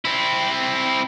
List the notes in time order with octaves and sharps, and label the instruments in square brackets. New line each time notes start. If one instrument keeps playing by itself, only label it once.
[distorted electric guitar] C4 E4